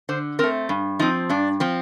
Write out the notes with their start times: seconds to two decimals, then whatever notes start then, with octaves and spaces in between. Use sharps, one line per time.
0.09 D3 C5
0.39 A3 C4 A#4
0.69 G2
0.99 F3 C4 D#4
1.29 G2 D4
1.60 F3 C4